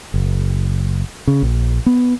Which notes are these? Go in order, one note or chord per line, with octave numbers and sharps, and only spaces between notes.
F#1
C#3
A#1
B3